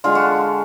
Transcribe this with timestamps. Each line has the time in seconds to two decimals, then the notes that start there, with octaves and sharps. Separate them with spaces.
0.04 D3 G#3 F4
0.15 F#4